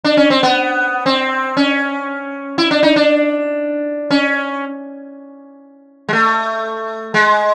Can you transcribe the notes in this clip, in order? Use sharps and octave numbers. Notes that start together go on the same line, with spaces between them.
D4
C#4
C4
B3
C4
C#4
E4
D4
D#4
D4
C#4
G#3
A3
G#3